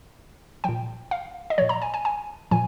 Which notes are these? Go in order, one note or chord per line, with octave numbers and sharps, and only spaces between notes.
A#2 F3 G5
F5
D#5
A#2 F3 C#5
A#5
G#5
G#5
G#5
A#2 F3 G#5